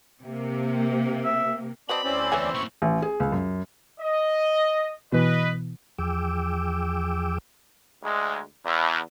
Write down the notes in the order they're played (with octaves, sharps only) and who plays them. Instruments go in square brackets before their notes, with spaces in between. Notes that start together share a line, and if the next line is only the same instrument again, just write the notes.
[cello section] C3 A#3
[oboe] E5
[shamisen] F#3 B4 D#5 [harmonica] C4 D5 A5 [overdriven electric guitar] B5
[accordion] D2 C#4 D5 [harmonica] C4 E4 C5
[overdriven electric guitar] E2 [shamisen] B4 E5 G#5
[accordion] F#2 C#6 [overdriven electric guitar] A2 A#3
[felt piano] A1
G#4
C#2
F#2
[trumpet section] D#5
[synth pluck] B2 E3 [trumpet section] B4 D#5
[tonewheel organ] E2 F3 G#4 G5 D6 E6
[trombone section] D2 G#3
E2